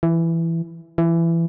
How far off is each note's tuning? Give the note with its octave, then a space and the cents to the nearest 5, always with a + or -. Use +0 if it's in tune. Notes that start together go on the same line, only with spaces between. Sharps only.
E3 +10
E3 +20